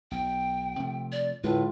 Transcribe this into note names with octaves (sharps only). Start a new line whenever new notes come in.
B1 G5
C3 F3 A3
D5
A2 D3 G#3 F4 B4